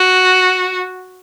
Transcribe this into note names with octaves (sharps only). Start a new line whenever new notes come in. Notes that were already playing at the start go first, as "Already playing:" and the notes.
Already playing: F#4